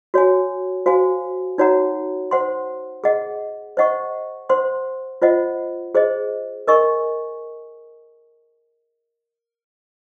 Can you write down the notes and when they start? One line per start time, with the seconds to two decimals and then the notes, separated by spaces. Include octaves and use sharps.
0.14 F#4 C#5 G#5
0.86 F#4 C5 F5 G#5
1.58 D#4 F#4 C#5 F#5 A#5
2.31 C5 F#5 C6
3.04 G#4 D#5 F#5
3.77 C5 D#5 F#5 C#6
4.49 C5 F#5 C6
5.22 F4 C5 D#5 F#5
5.95 G#4 C5 D#5
6.68 A#4 D#5 G#5 C#6